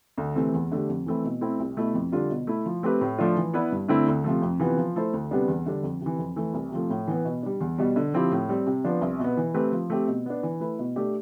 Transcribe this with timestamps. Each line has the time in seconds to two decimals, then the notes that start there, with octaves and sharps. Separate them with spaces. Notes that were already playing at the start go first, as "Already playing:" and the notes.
0.18 D2
0.36 C3 E3 A3 C4
0.53 E2
0.72 D3 A3 D4 G4
0.89 F2
1.06 E3 A3 C4 E4
1.24 B2
1.41 A3 C4 E4
1.59 C2
1.77 B2 A3 E4
1.94 F2
2.12 D3 G3 D4 F4
2.30 B2
2.47 A3 E4
2.66 F3
2.83 A3 C4 G4 B4
3.01 A2
3.18 F3 A3 D4 F4
3.37 E3
3.53 B3 E4 B4 D5
3.72 G2
3.89 D3 A3 C4 E4
4.07 D2
4.24 C3 F3 A3
4.42 F2
4.60 C3 E3 B3 F4
4.77 F3
4.96 A3 E4 A4 C5
5.13 D2
5.31 C3 G3 B3 D4
5.48 E2
5.66 D3 G3 D4
5.83 F2
6.01 C3
6.06 E3
6.19 F2
6.36 E3 A3
6.54 C2
6.71 C3 F3 A3
6.90 A2
7.07 E3 B3
7.25 B2
7.43 G3 D4
7.60 E2
7.78 B2 G3
7.96 D3
8.14 F3 C4 E4 G4
8.31 A2
8.49 G3 C4
8.66 C3
8.84 F3 B3 D4
9.02 C2
9.19 B2
9.24 B3
9.37 E3
9.54 A3 C4 G4 B4
9.72 F3
9.90 A3 C4 G4
10.08 B2
10.26 B3 D4
10.43 E3
10.60 A3 E4 B4
10.79 B2
10.96 A3 D4 G4